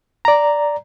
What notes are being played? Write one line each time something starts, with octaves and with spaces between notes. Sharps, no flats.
D5 A#5